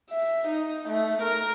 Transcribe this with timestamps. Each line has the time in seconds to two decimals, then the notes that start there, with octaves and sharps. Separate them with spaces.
0.10 E5
0.47 D#4
0.89 A3
1.22 A#4